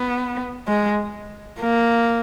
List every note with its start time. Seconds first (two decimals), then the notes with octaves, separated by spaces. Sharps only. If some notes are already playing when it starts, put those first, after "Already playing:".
Already playing: B3
0.67 G#3
1.60 A#3